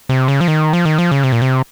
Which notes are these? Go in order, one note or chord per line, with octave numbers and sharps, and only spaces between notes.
C3
C#3
F3
D#3
F3
D#3
F3
C#3
C3
A#2
C3